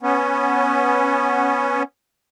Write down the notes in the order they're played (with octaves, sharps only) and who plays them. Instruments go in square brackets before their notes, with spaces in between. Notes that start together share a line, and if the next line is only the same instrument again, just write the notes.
[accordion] B3 C#4